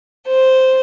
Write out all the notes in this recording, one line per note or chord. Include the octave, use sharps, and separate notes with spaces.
C5